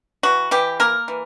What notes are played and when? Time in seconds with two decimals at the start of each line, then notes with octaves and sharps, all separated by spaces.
0.23 E3 F#4
0.51 E3 G4
0.80 A#3 A#4
1.08 E3